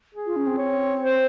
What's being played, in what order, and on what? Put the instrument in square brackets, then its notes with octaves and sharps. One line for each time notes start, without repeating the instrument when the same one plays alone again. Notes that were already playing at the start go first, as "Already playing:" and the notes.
[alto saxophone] G#4
[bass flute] F4
C#4
C4
[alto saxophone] C#5
C5